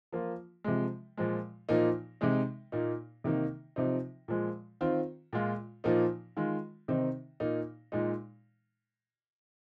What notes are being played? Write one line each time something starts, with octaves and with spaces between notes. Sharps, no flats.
F3 A#3 F4
C3 F3 G#3
A#2 F3 G#3
A#2 F3 A#3 D#4
C3 G#3 D#4
A#2 A#3 D#4
C3 D#3 A#3 D#4
C3 F3 C4 D#4
A#2 F3 G#3
D#3 C4 F4
A#2 G#3 F4
A#2 F3 A#3 D#4
D#3 G#3 F4
C3 D#3 C4 D#4
A#2 A#3 D#4
A#2 G#3 D#4